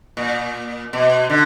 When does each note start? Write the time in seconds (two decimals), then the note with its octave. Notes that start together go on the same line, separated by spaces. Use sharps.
0.17 A#2
0.93 B2
1.30 D3